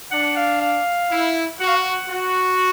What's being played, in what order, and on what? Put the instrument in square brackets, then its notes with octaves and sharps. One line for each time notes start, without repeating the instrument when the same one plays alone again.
[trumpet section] D4 [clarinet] F#5
[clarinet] F5
F5
[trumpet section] E4
[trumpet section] F#4 [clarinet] F#5
[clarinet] F5
F#5
[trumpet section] F#4